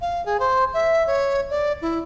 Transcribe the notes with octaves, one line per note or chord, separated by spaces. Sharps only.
F5
G#4
C5
E5
C#5
D5
E4